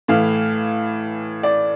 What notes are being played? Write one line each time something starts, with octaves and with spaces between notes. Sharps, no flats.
A2 E3 F5
D5